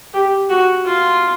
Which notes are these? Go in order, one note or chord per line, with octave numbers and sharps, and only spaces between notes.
G4
F#4
F4